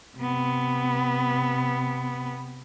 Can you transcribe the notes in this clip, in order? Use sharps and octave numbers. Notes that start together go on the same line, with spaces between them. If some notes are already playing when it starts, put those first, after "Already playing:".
C3 B3